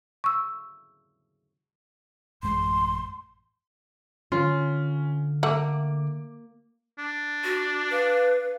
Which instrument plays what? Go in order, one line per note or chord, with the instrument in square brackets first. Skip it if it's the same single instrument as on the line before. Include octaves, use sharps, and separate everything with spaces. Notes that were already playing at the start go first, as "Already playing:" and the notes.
[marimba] C#6 E6
[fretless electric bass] A1 F#2 G#3 [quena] C6
[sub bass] D3 [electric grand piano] C#4 [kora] F4
[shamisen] A3 F#5 [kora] A#3 [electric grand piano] D6
[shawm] D4
[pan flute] F#4
[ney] B4 [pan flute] F5